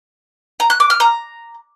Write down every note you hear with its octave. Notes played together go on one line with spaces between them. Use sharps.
A#5
F#6
D6
F6
A#5